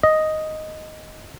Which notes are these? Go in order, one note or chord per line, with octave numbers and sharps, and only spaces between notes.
D#5